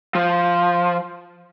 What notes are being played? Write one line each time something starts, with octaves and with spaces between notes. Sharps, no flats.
F3